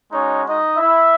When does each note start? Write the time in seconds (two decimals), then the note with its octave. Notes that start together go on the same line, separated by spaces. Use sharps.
0.11 G#3 C#4 D#4 F#4 C#5
0.45 D#4 D#5
0.78 E4 E5